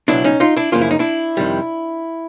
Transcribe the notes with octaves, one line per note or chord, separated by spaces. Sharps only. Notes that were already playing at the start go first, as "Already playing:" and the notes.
C#2 B2 F#3 B3 D4 E4
C#4 D#4
D#4 F4
D4 E4
F#2 C#3 F3 A#3 F4
E4
D#4
D4 E4
F2 C3 D#3 G3